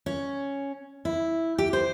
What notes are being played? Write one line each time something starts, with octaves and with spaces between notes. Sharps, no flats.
C#4
E4
G4
C5